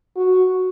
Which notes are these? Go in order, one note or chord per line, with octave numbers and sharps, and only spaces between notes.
F#4